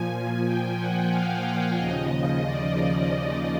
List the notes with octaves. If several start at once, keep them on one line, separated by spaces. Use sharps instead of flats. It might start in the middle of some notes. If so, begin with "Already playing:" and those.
Already playing: A#2 F3 G#5
G5
F#5
F5
F5
D#2 C#3 F3 D#5
D#5
D5
D#5